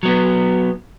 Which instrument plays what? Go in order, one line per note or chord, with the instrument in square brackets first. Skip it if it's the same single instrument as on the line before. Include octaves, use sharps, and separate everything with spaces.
[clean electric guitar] F#3 B3